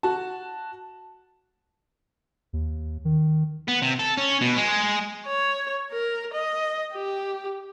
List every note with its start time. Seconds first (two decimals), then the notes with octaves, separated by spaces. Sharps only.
0.03 F#4 A5
2.53 D#2
3.05 D#3
3.68 B3
3.82 C3
3.99 A4
4.17 C#4
4.41 B2
4.57 G#3
5.27 C#5
5.92 A#4
6.34 D#5
6.94 G4